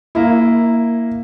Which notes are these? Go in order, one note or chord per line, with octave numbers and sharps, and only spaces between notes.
A#3 E4